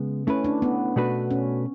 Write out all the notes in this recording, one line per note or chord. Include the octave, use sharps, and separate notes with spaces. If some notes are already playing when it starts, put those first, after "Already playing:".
Already playing: C#3 G#3 B3
A3 C#4 E4 B4
D4
B3
B2 A3 D4 F#4 B4
C#4